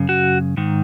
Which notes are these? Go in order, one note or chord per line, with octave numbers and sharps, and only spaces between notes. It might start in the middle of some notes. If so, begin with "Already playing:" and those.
Already playing: F#2 C#3
F#4
G#2 D#3